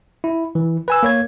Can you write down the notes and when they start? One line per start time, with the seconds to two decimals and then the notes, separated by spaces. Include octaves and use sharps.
0.24 E4
0.55 E3
0.88 B4 G#5 E6
1.03 A#3 C#5 G#6